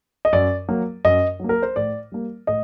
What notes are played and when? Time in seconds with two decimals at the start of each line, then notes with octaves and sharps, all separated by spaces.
0.25 D#5
0.33 F#2 D5
0.68 F#3 A#3
1.05 F#2 D#5
1.40 F#3 A#3
1.49 A#4
1.63 C5
1.76 A2 D5
2.12 G3 A#3
2.47 A2 D#5